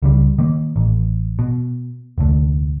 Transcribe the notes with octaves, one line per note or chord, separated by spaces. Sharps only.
C#2 C#3 G3
D#3 A#3
A1
B2
F1 D2